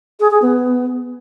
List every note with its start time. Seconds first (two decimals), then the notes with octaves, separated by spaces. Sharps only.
0.20 G#4
0.31 G#4
0.42 B3